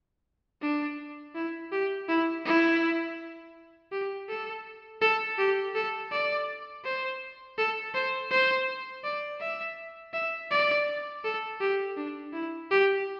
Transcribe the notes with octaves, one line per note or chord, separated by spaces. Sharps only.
D4
E4
G4
E4
E4
G4
A4
A4
G4
A4
D5
C5
A4
C5
C5
D5
E5
E5
D5
A4
G4
D4
E4
G4